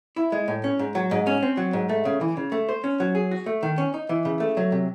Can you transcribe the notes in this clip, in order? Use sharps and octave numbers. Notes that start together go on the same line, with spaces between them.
E4
G#3
A2
C#4
G#2
F#3
G#2
C#4
C4
F#3
G#2
A3
C#3
E3
C#3
A3
C5
C#4
F#3
G#4
F#4
A3
D#3
C#4
D#4
E3
C#3
A3
F#3
C3